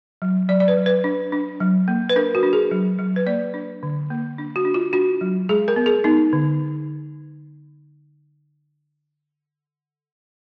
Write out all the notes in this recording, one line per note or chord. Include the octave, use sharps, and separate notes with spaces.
F#3
F#3 D5
D5
B4
F#3
B4
D4
D4
F#3
A#3
B4
D4 A#4
F#4
D4
G#4
F#3
F#3
B4
A#3 D5
D4
D3
A#3
D4
F#4
D4
F4
D4 F#4
F#3
G#3 G#4
A#4
B3
G#4
B3 D#4
D3